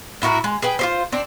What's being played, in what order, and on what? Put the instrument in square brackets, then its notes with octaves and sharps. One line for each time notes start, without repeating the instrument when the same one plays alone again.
[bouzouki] A2 E4 F#4 A#4
G#3
G#4 B4 G5
F4 G4 C5
C4 D4